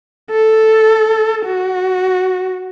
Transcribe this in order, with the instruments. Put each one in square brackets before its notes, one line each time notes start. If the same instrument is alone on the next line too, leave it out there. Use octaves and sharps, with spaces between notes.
[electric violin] A4
F#4